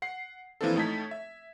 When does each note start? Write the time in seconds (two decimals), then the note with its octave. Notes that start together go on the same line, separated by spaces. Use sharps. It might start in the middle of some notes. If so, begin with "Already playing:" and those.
0.02 F#5 C7
0.61 E3 F3 A#3 C4 D4 A4
0.76 A2 A3 D#4 A5 G#6 B6
1.11 E5